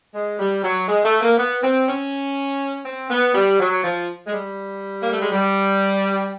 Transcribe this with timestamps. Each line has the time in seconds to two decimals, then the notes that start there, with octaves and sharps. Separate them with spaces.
0.14 G#3
0.39 G3
0.64 F#3
0.88 G#3
1.05 A3
1.21 A#3
1.38 B3
1.63 C4
1.87 C#4
2.85 C4
3.10 B3
3.35 G3
3.60 F#3
3.84 F3
4.26 G#3
4.33 G3
5.01 A#3
5.11 A3
5.21 G#3
5.32 G3